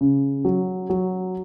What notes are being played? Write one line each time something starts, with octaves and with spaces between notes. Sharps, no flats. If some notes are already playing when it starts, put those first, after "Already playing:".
C#3
F#3
F#3